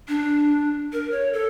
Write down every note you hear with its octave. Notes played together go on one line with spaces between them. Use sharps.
D4
A#4
C#5
A4